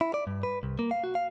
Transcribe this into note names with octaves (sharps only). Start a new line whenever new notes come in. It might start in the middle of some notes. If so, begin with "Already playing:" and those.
E4
D5
G2
B4
C2
A#3
F5
F#4
F5